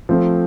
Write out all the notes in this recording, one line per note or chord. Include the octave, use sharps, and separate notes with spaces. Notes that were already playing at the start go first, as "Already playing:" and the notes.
F3 A3 C4